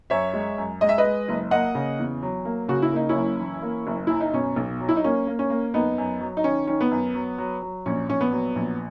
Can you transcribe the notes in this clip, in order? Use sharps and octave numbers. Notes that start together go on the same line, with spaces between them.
F#2 C#5 E5
G#3
F#2
G#3 D#5
E5
B4 D#5
G#3
F#1
A#3 D#5 F#5
C#3
E2
F#3
A#3
C#3 F#4
E4
A#3 D#4
C#4 E4
F#1
E3
A#3
F#1
F#2 E4
D#4
B2 C#4
B1
F#3
E4
D#4
A#3 C#4
A#3
C#4
A#3
F#2 B3 D#4
F#2
F#3
D#4
D#3 C#4
D#3 C#4
B3
F#2
F#3
F#3
F#3
A#1 C#4
A#1 C#4
B3
F#3
A#1